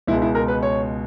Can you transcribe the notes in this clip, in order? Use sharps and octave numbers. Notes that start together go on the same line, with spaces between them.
C#2 B2 G#3 E4
E4
A#4
B4
C#5